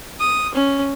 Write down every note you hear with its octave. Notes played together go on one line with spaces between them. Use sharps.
D#6
C#4